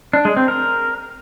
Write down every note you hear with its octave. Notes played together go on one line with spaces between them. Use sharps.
D4
G#3
C4
A#4